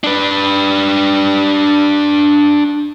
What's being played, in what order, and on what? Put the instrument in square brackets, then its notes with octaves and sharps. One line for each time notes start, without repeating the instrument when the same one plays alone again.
[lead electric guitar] D4 B4